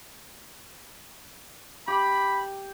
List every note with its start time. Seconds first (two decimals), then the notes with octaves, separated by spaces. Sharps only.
1.88 G4 B5